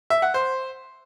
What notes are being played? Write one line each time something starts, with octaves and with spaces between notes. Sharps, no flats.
E5
F#5
C5